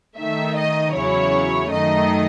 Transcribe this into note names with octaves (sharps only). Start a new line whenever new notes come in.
D#3 A3 D#4 E5
D#5
E2 C#3 F#3 C#4 E4 C#5
F#2 D#3 A3 D#4 D#5